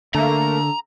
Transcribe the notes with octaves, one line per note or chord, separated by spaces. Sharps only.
D3 A3 A#3 A#5